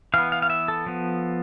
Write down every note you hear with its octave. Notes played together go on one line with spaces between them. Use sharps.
E3 B3 F5
F5
F5
E5
A4
F3 B3